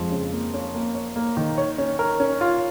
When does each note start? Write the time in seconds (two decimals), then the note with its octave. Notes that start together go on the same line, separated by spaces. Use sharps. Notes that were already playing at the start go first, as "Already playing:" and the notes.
Already playing: F2 G#3
0.12 C#3
0.33 A#3
0.54 C#4
0.75 A#3
0.95 C#5
1.16 A#3
1.37 D#3
1.58 C#5
1.78 C#4
1.99 A#4
2.20 C#4
2.41 F4